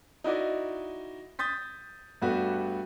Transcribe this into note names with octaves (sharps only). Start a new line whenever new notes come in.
D#4 E4 F#4 D5 D#5
D#6 G6 A6 B6
G2 G3 A3 B3 F#4 G4